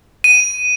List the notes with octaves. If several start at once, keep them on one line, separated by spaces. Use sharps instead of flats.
D#7